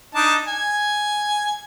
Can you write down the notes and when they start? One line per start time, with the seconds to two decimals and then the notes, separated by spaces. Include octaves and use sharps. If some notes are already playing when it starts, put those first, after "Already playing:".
0.15 D4 D#4 A5
0.48 G#5